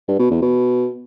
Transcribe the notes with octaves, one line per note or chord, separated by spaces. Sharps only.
G2
B2
E2
B2